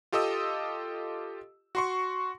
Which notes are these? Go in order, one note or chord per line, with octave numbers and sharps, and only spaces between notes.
F4 G4 A4 D#5 D#6 E6
F#4 C6 C#6